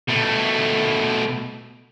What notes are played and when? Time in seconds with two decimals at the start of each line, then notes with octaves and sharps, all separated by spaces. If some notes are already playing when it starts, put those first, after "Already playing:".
0.08 B2 A3